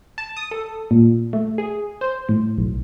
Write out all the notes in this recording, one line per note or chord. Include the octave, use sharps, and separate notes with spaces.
A5
D#6
A4
A#2
A3
G#4
C5
A2
B1